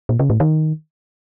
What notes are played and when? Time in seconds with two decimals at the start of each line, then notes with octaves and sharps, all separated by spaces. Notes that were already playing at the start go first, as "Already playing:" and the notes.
0.09 A#2
0.19 C#3
0.30 A2
0.40 D#3